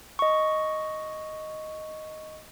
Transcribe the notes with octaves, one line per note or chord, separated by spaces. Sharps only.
D#5 C#6